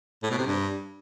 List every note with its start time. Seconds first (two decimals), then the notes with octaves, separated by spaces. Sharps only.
0.23 A2
0.31 B2
0.38 C3
0.46 G2